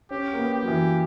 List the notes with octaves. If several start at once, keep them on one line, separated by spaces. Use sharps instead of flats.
C#4 G4
A#3
B3
G4
F#3
E3